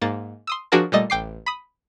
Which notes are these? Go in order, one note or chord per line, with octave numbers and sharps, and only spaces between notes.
G#2 A#3 A6
C6 D#6 E6
F3 D4 F#4 G#4 A#4 A5
A#2 G3 A3 D#5 D#6 A6
A1 G5 D6 C7
B5 D#6